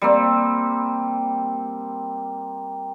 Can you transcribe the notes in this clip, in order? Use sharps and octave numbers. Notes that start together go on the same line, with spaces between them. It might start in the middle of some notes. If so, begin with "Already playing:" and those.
G3 A#3 C4